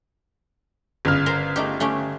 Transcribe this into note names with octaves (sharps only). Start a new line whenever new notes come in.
G1 C#3 F6
A#4 C5
A3 D#4 G4
A3 C#4 G4